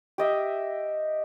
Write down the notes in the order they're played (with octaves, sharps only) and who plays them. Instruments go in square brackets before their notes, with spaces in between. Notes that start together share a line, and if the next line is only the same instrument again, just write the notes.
[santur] G4 D#5 E5